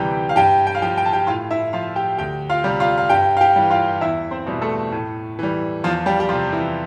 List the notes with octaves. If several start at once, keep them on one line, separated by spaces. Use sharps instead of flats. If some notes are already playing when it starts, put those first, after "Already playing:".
Already playing: D2 C3 E3 G3 G4 G5
F5
G2 G4 G5
G5
F5
F3 G4 G5
G5
A5
G4 G5
A2 F4 F5
E4 E5
F3 F4 F5
G4 G5
D2 G4 G5
F4 F5
C3 G3
F4 F5
F5
G2 G4 G5
F5
G4 G5
E3 G3
F4 F5
E2 E4 E5
C4 C5
B2 G3
A3 A4
A2
E3 G3
E2 F3 F4
G3 G4
G4
C3 F3 F4
E3 E4